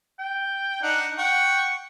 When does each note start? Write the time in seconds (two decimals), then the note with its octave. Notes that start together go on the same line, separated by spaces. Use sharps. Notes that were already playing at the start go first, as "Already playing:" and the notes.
0.19 G5
0.83 D4 D#4 F#5
1.18 F#5 G5 C#6